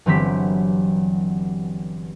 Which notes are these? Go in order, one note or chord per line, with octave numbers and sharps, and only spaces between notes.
G1 E3 F#3 C4 G4 B6